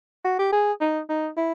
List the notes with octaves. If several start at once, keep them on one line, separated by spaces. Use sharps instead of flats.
F#4
G4
G#4
D#4
D#4
E4